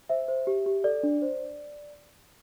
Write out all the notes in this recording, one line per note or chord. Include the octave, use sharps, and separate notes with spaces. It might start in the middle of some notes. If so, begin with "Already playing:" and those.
C5 E5
C5
G4
G4
A4 D5
D4
C5